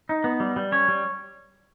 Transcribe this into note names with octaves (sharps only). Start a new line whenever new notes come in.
D#4
B3
G3
G3
C#4 C#5
G3